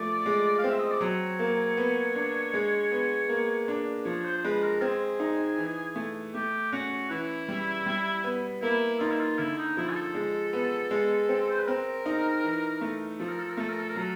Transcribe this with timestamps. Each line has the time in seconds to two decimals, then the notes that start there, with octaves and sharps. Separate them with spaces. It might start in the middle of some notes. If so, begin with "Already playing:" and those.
Already playing: F3 A3 D5
0.26 G#3
0.58 F5
0.64 C4
0.70 E5
0.79 D#5
0.91 D5
1.01 F#3 C#5
1.39 A#3
1.77 B3
2.15 D4
2.54 G#3
2.91 B3
3.29 A#3
3.68 D4
4.05 F3 C#5
4.25 C5
4.38 C5
4.44 G#3 B4
4.63 A#4
4.81 C4 G#4
5.20 D#4
5.58 E3
5.96 A3
6.34 A3 G4
6.72 C#4 F#4
7.10 E3 E4
7.49 G3
7.86 G3
8.24 B3
8.62 A#3 E4
9.00 D#4 F4
9.11 E4
9.21 F4
9.39 D3 E4
9.58 D#4
9.77 F3 E4
9.90 G#4
9.96 A4
10.15 G#3
10.53 B3
10.91 G#3
11.29 C4
11.50 C5
11.58 B4
11.67 C4 A#4
12.06 D#4
12.44 E3
12.81 A3
13.20 F3 A4
13.29 A#4
13.39 A4
13.49 A#4
13.57 A3 A4
13.69 A#4
13.79 A4
13.89 A#4
13.96 F#3 A4